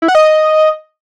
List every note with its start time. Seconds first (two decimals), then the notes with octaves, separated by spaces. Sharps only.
0.02 E4
0.08 F#5
0.15 D#5